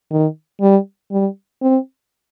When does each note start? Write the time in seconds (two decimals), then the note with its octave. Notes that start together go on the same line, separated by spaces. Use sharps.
0.11 D#3
0.61 G3
1.11 G3
1.62 C4